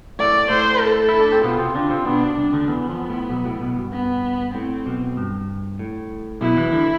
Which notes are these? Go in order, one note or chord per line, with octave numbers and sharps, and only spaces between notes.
A2 A3 D5
A2 A3 C5
A4
E4
D4
C4
B2 B3 F4
C3 C4
D3 D4 F4
C3 C4
B2 B3 D4
C2 C3 D4
D2 D3
E2 E3 B3
F2 F3
A2
B1 B2
A2
B1 B2
G2
B3
A2 C4
B1 B2
G2
A2
B1 B2 E4
E2 E3
D2 D3